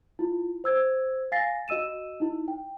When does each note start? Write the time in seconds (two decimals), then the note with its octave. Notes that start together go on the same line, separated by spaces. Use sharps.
0.19 E4 F4
0.64 C5 E6 G#6
1.32 F5 G#5 A6 A#6 C7
1.68 F#4 D#5 E6 D#7 E7
2.20 D#4 E4
2.48 G5